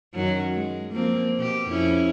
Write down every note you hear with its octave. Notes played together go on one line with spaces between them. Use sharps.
F#2 D#3 F#3
G#3
F3 A#3 C4
B2 G4
F2 C#4 E4